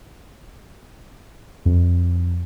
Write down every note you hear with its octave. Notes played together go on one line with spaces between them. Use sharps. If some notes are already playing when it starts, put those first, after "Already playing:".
F2